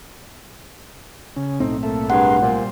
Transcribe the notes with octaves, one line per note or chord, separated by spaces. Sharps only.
C#3 C#4
B1 A2 A3 C4 D#4
A#3 A4 E5
G2 G#4 A#4 F#5 C6
A#2 G3 C5